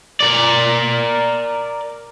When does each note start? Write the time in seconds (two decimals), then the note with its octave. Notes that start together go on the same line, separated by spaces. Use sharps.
0.20 A#4 D5